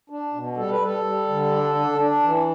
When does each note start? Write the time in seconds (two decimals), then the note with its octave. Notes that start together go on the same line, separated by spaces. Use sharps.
0.10 D4
0.34 B2
0.57 G3 A4
0.70 B4
0.80 G3 A4
1.04 G3
1.28 D3
1.52 D4
1.75 D4
1.98 D4
2.23 E3